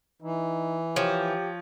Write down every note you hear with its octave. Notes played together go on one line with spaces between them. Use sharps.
E3 D#4
F3 G4 C#5